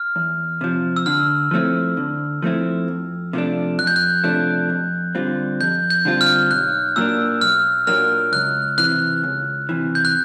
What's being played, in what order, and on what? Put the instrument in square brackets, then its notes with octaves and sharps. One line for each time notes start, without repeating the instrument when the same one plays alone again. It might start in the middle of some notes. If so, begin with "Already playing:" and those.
Already playing: [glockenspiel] F6
[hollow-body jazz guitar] E2
C3 F3
[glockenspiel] E6
[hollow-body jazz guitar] D3 [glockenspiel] F6
[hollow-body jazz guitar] F3 A3 C4 E4
D3
F3 A3 C4 E4
F2
C3 F3 A3 D4
[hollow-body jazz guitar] F2 [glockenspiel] F#6
[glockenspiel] G6
F#6
[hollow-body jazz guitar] C3 F3 A3 D4
F2
D3 G3 C4 F4
[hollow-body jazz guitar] F2 [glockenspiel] G6
[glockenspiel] G6
[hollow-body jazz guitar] D3 G3 C4 F4
[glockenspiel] F6
[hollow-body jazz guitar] B1 [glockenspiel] F#6
[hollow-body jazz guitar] A#2 F#3 A#3 D4 [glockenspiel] E6
[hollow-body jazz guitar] B1 [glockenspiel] F6
[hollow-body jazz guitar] A#2 F#3 A#3 D4 [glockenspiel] F6
[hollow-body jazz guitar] C#2 [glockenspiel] F#6
[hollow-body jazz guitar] C3 E3 [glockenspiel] F#6
[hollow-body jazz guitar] C#2
C3 E3
[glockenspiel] G6
F#6